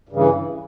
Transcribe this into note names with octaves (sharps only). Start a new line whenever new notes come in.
G2 C#3 E3